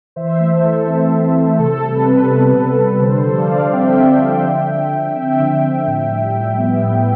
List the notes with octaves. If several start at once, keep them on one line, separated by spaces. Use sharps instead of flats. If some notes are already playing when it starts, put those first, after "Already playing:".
E3 C5 E5
A3
A4
E3
C4
E3
A3
C3 A4
G3
B4
C3
B3
C3
G3
D3 A4 C5
A4 C5
F3
D5 F5
D3
C4 E5 G5
D3
F3
D3
F3
D3
C4 E5 G5
D3
F3
A2
G3
A2
B3
A2